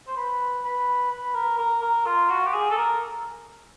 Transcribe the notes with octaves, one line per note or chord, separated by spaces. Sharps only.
C5
B4
B4
B4
A#4
A#4
A#4
F4
F#4
G4
G#4
A4
A#4